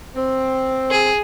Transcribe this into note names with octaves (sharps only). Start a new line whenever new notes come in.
C4
G#4